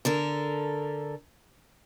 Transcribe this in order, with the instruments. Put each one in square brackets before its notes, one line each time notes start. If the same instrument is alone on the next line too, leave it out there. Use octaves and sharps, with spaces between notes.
[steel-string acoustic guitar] D3 A4 A#4